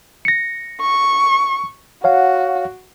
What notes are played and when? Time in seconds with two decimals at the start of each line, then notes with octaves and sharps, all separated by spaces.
0.25 A#6 C#7
0.81 C#6
2.04 F#4 C#5 F5 F#5